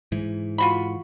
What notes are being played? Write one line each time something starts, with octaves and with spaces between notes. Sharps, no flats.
G#2 E3
F4 F#4 B5